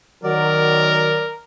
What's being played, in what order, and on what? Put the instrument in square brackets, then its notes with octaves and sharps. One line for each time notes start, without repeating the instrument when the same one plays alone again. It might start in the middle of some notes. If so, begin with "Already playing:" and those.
[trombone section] D#3 F#3 [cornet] A#4 [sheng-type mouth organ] D5